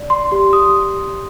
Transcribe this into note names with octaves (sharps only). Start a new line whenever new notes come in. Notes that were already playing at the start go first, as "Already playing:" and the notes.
Already playing: D5
D5 C6
G4 C6
G4 D#6